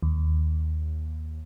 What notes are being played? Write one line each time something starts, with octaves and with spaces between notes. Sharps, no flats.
D#2